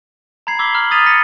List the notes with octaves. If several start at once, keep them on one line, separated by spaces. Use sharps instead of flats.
A#5 B5 G#6 C7
B5 D6 E6 G#6 B6 G7
A#5 B5 F6 F#7
D#6 G#6 A6 B6 D#7 F7
B5 A#6 B6 C#7 D#7